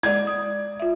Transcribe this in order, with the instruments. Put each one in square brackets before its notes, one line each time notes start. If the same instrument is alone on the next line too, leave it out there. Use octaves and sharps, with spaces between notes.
[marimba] G#3 E4 [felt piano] D5 G#6
[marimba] D#6
F4 E5